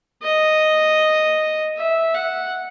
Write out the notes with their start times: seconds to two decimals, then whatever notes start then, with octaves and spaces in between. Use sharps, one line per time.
0.23 D#5
1.77 E5
2.14 F#5